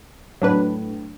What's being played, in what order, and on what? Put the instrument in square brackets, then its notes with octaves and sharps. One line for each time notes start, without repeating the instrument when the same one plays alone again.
[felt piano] A2 [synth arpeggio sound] F#3 D4 B4